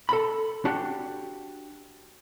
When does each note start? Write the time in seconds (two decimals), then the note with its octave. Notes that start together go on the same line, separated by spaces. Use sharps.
0.09 A4 B5
0.65 D4 F#4 G4